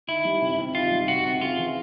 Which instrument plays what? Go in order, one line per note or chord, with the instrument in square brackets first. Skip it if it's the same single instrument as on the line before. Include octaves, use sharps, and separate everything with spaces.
[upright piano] D#3 [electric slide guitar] E4
[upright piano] G3
C3
C3
[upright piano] D#3 [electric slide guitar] F4
[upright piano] G3
[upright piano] C3 [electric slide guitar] F#4
[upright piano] C3
[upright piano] C#3 [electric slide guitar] F4
[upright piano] E3